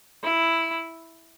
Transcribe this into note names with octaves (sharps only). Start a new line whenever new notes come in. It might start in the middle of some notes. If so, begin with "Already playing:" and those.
E4